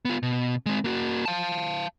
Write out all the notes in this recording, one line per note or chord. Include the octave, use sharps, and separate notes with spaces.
B3 F4
B2
G#3 C4
A#3 F#4
F5 A5